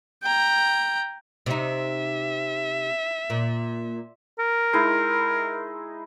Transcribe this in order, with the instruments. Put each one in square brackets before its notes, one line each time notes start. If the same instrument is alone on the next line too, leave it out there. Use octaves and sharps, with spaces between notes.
[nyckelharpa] G5 A#5
[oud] C3 D#4 [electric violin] E5
[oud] A#2
[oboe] A#4
[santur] G#3 D#4 E4